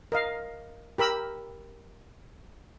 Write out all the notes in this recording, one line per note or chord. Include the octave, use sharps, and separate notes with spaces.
A#4 D#5 F5
G4 A#4 B5 E6